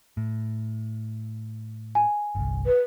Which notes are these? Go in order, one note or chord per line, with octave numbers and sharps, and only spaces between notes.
A2
G#5
G1 C2
B4